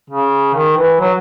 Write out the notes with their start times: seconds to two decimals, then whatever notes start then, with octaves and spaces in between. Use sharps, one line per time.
0.10 C#3
0.55 D#3
0.77 E3
1.00 F#3